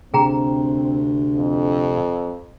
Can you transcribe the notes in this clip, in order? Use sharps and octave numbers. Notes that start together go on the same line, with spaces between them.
D2 C3 C4 G#4 G5 A#5
F2